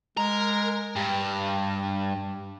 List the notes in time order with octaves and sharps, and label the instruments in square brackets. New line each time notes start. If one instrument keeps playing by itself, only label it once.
[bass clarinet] G#3 [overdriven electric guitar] A#4
[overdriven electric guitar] G2 [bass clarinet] G4